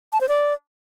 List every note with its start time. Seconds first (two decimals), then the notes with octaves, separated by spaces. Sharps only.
0.13 A5
0.21 C5
0.29 D5